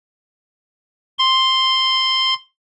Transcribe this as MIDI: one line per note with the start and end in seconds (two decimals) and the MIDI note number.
1.19 2.34 84